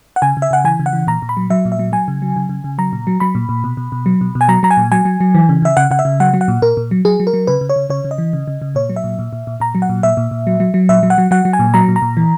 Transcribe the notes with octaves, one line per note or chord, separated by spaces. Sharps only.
F#5
C#3 G#5
C#3
E5
C#3 F#5
E3 G#5
C#3
F#5
E3
A#2 A#5
A#2
B5
F#3
F#3 E5
A#2
E5
F#3
F#3 G#5
C#3
F#3
C#3
C#3
C#3
F#3 A#5
A#2
F#3
F#3 B5
A#2
A#2
B2
B2
B2
F#3
B2
B2
G#5
F#3 A#5
F#3 A#5
G#5
A#2
F#3 G#5
F#3
F#3
E3
C#3
C#3 E5
C#3 F#5
C#3 F#5
E5
C#3
F#3 F#5
F#3
F#5
A#2
A#2 A#4
A#2
F#3
F#3 G#4
F#3
A#4
F#3
C#3 B4
C#3
C#5
C#3
C#3 C#5
C#3
D#5
E3
C#3
C#3
C#3
A#2 C#5
F#3
E5
A#2
A#2
A#2
A#2
A#2 A#5
F#3
F#5
A#2
A#2 E5
A#2
A#2
F#3
F#3
F#3
A#2 E5
F#3
F#5
F#3
F#3 F#5
F#3
G#5
A#2
F#3 A#5
A#2
A#5
A#2
E3